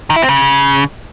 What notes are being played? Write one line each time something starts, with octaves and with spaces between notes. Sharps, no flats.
D#3
E4
C4
C#3